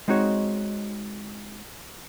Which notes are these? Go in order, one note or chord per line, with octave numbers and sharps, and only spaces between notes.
G#3 C4 D#4 F#4 C#5